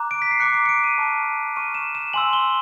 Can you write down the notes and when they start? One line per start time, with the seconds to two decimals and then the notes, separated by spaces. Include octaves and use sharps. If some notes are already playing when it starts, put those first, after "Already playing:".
Already playing: A#5 D6 F#6
0.11 D7
0.22 B6
0.31 C7
0.40 A#5 D6 F#6 C#7
0.54 D7
0.66 C#7
0.69 D7
0.84 D#7
0.98 A5 C#6 F6
1.56 A5 C#6 F6 D#7
1.74 E7
1.95 E7
2.13 G#5 C6 E6 F#7
2.33 G7